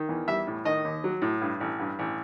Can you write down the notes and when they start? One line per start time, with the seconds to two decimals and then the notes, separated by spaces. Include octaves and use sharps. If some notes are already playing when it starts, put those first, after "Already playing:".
Already playing: D#3
0.09 E2
0.28 G3 E5
0.47 A2
0.65 D#3 D#5
0.85 D#2
1.04 F#3
1.22 A2
1.41 G2
1.60 A1
1.80 G2
1.99 A1